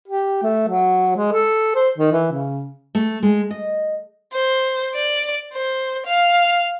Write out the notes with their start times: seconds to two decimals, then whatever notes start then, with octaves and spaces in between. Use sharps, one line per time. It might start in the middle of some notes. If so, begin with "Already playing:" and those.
0.08 G4
0.43 A3
0.68 F#3
1.16 G#3
1.32 A4
1.75 C5
1.98 D#3
2.12 E3
2.32 C#3
2.95 A3
3.23 G#3
3.51 D#5
4.33 C5
4.95 D5
5.53 C5
6.06 F5